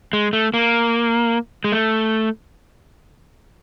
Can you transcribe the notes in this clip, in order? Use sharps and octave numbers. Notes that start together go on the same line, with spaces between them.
G#3
A3
A#3
G#3
A3